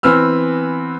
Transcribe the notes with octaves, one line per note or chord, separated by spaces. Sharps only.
E3 B3 C4 B4 E6 F6